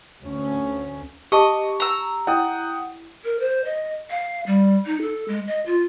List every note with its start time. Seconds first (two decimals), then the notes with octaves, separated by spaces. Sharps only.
0.23 D2 C#4
1.32 G4 D#5 A5 C#6 D6
1.80 A#5 E6
2.27 E4 D#5 F#5 G5 D#6
3.25 A#4
3.40 C5
3.65 D#5
4.11 F5
4.47 G3
4.86 D#4
5.01 A4
5.28 G#3
5.47 D#5
5.66 F4